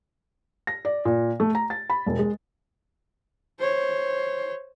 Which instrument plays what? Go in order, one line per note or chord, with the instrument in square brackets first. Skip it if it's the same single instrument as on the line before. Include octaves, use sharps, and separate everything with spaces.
[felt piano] A#6
D5
A#2
A3
A#5
A6
B5
E1
G#3
[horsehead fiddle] C5 C#5